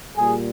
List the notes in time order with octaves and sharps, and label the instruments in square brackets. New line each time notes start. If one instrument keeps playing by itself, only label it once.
[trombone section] A#2 G3 G#4